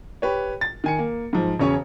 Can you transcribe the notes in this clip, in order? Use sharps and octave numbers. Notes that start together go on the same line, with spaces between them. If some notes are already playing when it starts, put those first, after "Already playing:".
G4 B4 C#5
A6
D#3 G#5 C#7
A#3
G#2 F3
E1 C#3 C#4 C#5 G#5